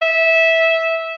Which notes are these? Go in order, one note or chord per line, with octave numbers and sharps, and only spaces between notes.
E5